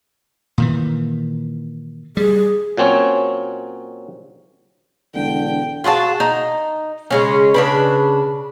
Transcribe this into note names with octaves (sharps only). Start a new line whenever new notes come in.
A#2 D#3 E3
G3 G#4
A#2 F#3 C4 C#4 C#5
E1 D3 G5
F4 F#4 G#4 A5
D#4
C#3 G#3 C#4
C#3 D4 B4